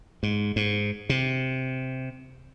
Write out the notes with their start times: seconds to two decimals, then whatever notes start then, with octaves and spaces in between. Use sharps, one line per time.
0.23 G#2
0.56 G#2
1.09 C3